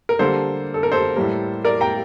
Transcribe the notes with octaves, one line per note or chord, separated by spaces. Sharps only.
A#4
D3 G3 A#3 A4 C5
A4
A#4
A4 C5
A2 G3 A#3
A#4 D5
G5 A#5